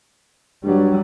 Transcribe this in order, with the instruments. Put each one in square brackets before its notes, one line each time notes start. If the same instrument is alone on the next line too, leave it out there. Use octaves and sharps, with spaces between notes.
[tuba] G2 [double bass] F#3 G3